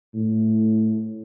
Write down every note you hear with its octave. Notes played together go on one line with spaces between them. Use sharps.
A2